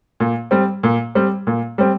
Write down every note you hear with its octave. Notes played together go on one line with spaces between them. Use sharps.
A#2
G3 C4
A#2
G3 C4
A#2
G3 C4